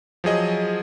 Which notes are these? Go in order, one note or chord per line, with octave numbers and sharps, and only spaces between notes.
F3 F#3 G#4 D#5